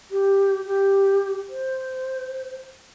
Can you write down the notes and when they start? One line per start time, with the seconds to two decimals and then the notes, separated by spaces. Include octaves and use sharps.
0.11 G4
0.67 G4
1.49 C5